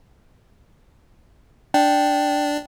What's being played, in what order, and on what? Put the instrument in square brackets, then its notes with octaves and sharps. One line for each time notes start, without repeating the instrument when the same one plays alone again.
[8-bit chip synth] D4 [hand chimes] G5